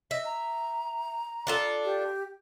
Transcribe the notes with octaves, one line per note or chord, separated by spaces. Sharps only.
D#5 E5
A#5
D4 F4 A4
G4